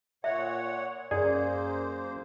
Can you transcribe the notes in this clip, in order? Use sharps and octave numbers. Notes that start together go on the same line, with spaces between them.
A#2 C#5 E5 F#5
F#2 A#3 G#4 C5 D5